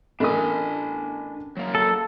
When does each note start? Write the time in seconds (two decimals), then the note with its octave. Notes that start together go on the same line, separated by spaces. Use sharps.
0.20 A1 D4 A#4 G#5 D#6
1.57 F#3 A#3
1.75 A4